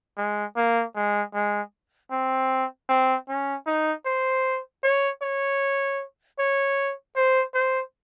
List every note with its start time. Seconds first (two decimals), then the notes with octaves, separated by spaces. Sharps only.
0.18 G#3
0.57 A#3
0.95 G#3
1.34 G#3
2.11 C4
2.89 C4
3.28 C#4
3.67 D#4
4.06 C5
4.83 C#5
5.22 C#5
6.39 C#5
7.16 C5
7.54 C5